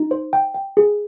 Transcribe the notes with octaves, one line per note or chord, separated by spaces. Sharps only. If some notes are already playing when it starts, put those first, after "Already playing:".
Already playing: D#4
C5
G5
G5
G#4